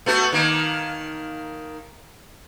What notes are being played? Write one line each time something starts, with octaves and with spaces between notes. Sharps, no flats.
A3 B3 F#4
D#3 A#3